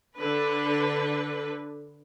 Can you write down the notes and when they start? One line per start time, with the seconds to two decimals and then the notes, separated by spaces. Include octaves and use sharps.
0.17 D3 D4 B4